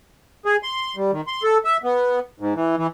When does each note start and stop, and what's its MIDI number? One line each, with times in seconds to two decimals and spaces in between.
0.45 0.56 68
0.63 0.96 84
0.96 1.11 55
1.12 1.21 51
1.27 1.43 84
1.43 1.58 69
1.65 1.77 76
1.83 2.20 59
2.40 2.54 44
2.55 2.76 52
2.77 2.87 52